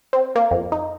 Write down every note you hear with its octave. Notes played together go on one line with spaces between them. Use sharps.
C4
A#3
F2
D#4